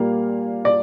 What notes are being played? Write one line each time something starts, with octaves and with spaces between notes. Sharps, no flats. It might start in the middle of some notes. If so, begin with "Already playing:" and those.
Already playing: A#2 G3 A#3 F5
D5